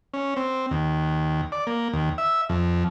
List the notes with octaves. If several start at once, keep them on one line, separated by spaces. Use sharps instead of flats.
C#4
C4
D#2
D5
A#3
D#2
E5
F2